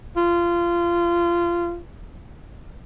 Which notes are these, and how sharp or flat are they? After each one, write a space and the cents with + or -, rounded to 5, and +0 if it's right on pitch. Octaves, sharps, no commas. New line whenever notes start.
F4 -20